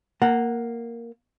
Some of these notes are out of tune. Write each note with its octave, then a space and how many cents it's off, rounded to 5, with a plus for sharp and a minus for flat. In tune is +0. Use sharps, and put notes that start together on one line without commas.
A#3 +0 F#5 +0 A5 +40